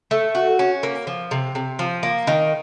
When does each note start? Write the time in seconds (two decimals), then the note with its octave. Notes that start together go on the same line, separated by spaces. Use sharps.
0.11 A3
0.35 F#4
0.59 C#4
0.83 A#3
1.07 F3
1.31 C3
1.55 C3
1.79 F3
2.03 A#3
2.27 D#3